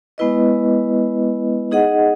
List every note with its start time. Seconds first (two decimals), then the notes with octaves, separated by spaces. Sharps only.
0.18 G#3 B3 E4 B4 D#5
1.71 D#4 G#4 D#5 F#5